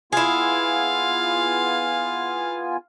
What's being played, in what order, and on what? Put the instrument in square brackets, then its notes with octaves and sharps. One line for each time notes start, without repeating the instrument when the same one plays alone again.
[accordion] B3 F4 G#5 [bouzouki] E4 G#4 [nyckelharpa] F5